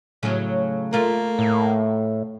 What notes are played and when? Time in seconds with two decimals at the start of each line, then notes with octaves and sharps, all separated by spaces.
0.23 A2 C#3 F#3
0.93 A3 A#3 F4 A#4
1.39 A2